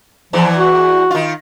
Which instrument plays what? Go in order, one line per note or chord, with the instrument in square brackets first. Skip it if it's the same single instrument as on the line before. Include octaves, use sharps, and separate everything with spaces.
[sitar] E2 E3 [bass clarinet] F3
[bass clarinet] F#4
[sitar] D#3 F4